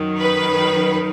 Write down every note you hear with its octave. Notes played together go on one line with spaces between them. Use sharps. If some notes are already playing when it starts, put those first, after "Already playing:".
Already playing: F#2 D#3 F#3
B4